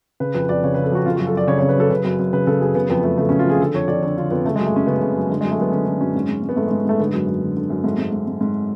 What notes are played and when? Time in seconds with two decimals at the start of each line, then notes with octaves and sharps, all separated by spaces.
0.20 C#3 B4
0.34 F2 B4
0.49 F2 D5
0.63 C#3 C#5
0.74 C#3 B4
0.84 A4
0.92 F2 F#4
1.06 C#3 F4
1.16 F#4
1.19 F#2
1.27 A4
1.33 F#2 D5
1.47 C#3 C#5
1.59 C#5
1.62 C#3
1.69 B4
1.76 F#2 A4
1.91 C#3 B4
2.05 F#2 B4
2.19 F#2
2.33 C#3 B4
2.47 C#3 A4
2.61 F#2 G#4
2.75 C#3 B3
2.89 F2 B3
3.03 F2 A3
3.18 C#3 A3
3.29 C#4
3.31 C#3
3.39 F4
3.47 F2 G#4
3.60 D3 A4
3.74 F2 C#5
3.88 F2 D5
4.03 D3 C#5
4.17 D3 F4
4.31 F2 B3
4.45 C#3 A3
4.56 G#3
4.59 F#2
4.66 A3
4.74 F#2 C#4
4.87 C#3 B3
5.01 C#3
5.16 F#2
5.30 D3 G#3
5.41 G#3
5.44 F#2
5.51 A3
5.59 F#2 B3
5.72 D3 C#4
5.87 D3
6.01 F#2 C#4
6.15 G#2
6.29 G#2
6.43 G#2
6.49 B3
6.57 G#2 A3
6.67 G#3
6.71 G#2
6.85 G#2 A3
7.00 D3 B3
7.14 F#2
7.28 F#2
7.43 D3
7.57 D3
7.70 F#2
7.84 G#2 A3
7.98 G#2
8.12 G#2
8.27 G#2
8.41 G#2